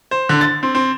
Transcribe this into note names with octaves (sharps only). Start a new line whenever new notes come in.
C5
D3
A6
C4
C4